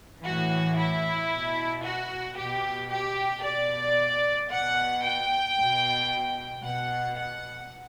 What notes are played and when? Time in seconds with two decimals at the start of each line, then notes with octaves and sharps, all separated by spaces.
0.25 A2 E3 F#4
0.78 E4
1.31 B2
1.85 F#4
2.38 B2 G4
2.91 G4
3.44 B2 D5
4.51 B2 F#5
5.04 G5
5.57 B2
6.64 B2 F#5
7.18 F#5